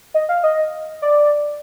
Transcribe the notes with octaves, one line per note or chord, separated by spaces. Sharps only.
D#5
F5
D#5
D5